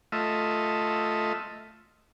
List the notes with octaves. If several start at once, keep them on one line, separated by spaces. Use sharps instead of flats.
A3 F4 D#5 E5